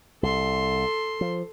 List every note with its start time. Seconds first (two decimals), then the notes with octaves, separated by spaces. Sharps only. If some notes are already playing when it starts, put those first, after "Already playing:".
0.23 C2 A4 C6
1.21 F3